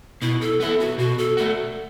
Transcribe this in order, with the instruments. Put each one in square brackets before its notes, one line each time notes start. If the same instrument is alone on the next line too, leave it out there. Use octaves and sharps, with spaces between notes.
[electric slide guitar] B2 [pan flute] E4
[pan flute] A4
[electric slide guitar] B3 E4 [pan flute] A4
[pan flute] F#4
[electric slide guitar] B2 [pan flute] F#4
[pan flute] A4
[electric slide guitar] A3 F#4 [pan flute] A4